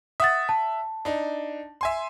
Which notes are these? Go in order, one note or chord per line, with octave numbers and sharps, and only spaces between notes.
E5 F#5 D#6 A6
A5
D4 D#4
E5 G#5 C6